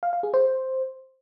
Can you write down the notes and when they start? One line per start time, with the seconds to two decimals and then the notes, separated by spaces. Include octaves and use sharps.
0.03 F5
0.13 F5
0.23 G#4
0.34 C5